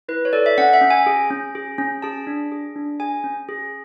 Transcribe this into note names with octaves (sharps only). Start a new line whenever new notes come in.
E4 B4
C#5
A4 D5
E5
C#4 F#5
E5
C#4
G#5
G#4
C#4
G#4
C#4
G#4 A5
D4
G#4
D4
G#4 G#5
C#4
G#4